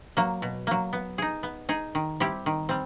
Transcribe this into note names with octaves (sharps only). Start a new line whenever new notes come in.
F#3 A#3
B2
F#3 A#3
B3
D#4 G#4
B3
D#4 G#4
D#3
G3 C4 E4 G4
D#3
G3 C4